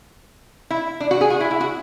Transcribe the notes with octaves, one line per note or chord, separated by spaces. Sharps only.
E4
D4
F#4
G#4
F#4
E4
E4
F#4